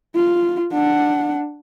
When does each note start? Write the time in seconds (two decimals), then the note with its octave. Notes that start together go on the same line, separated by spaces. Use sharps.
0.16 F4
0.72 D4 F#5